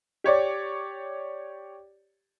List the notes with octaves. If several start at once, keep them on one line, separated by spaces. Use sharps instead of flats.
G4 C#5 D5